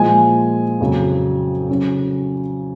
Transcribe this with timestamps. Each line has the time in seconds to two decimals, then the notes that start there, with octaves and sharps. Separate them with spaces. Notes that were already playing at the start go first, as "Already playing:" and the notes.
Already playing: A#2 F3 G#3 G#5
0.80 F2 C#3 F#3
1.69 C#3 F#3 C#4